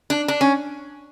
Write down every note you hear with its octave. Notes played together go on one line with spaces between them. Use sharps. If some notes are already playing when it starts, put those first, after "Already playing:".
D4
D4
C#4